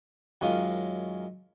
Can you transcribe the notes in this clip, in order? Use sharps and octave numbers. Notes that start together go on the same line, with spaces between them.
F#2 D#3 G#3 C#4 F4